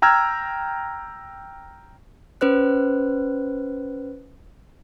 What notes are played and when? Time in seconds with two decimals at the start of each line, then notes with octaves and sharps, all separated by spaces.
0.02 G5 A#5 E6 F6 G#6
2.41 C#4 B4 C5 F#6